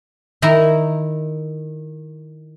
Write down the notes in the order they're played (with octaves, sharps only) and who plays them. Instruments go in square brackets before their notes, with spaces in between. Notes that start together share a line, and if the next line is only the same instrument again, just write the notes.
[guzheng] D#3 E4 A#5